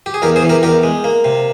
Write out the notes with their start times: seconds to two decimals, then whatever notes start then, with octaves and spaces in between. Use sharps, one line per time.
0.06 G4
0.14 G#4
0.22 E2 G4 A#4
0.36 G#4 C5
0.42 E3
0.49 G4 A#4
0.63 E2 G4 A#4
0.83 G#3
1.04 A#3
1.24 C3